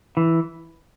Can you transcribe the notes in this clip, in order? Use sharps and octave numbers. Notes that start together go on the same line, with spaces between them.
E3